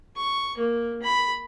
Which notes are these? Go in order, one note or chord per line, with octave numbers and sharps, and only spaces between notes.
C#6
A#3
B5